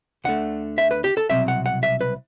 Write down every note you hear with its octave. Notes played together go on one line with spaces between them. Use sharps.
D2 D3 A3 F#5
E5
B4
G4
A4
C2 B2 F#3 C4 E5
F#5
F#5
E5
B4